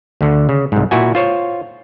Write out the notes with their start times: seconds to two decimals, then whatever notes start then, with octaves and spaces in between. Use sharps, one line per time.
0.21 D2 D3
0.49 C#3
0.72 C2 G#2
0.91 A#2 E4 F#4 G#5
1.15 F4 C5 C#5